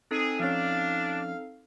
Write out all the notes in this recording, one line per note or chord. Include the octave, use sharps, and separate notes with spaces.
C4 D#4 G#4 A4
F3 C#4 D4 F5